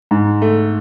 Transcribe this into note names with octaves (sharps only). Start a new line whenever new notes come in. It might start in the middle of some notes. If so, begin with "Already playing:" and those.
G#2
A3